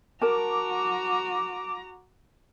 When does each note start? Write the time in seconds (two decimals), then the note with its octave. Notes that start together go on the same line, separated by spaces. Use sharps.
0.22 F#4 A#4 A5 A#5 D6